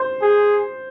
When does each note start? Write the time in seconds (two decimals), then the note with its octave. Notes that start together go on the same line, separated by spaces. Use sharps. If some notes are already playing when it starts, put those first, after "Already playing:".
Already playing: C5
0.22 G#4